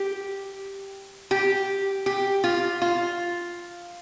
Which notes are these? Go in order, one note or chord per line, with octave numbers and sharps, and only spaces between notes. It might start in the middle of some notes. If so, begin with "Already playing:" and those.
Already playing: G4
G4
G4
F4
F4